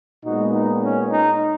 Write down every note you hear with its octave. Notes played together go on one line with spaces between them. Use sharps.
A#2 G#3 B3 D#4 F#4
D#4
C#4
D#4